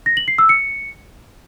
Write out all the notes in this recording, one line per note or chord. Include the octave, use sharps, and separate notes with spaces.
A#6
F#7
C7
E6
C#7